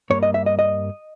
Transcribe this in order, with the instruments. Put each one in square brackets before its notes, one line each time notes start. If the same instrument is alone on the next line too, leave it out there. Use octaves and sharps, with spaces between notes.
[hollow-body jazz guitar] G2 G3 A#3 C#5
D#5
E5
D#5
D#5